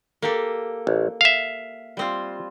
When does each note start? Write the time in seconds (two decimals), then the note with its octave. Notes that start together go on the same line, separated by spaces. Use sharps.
0.22 A#3 G4 A4
0.87 A1
1.21 E5 F5
1.97 G3 C4 F4